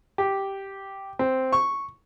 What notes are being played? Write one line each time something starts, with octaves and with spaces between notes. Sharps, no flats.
G4
C4
C#6